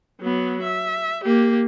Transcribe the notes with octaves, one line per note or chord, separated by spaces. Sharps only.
F#3 B3
E5
A#3 G4